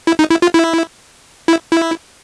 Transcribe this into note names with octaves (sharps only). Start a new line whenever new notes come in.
E4
D#4
E4
F4
E4
E4
E4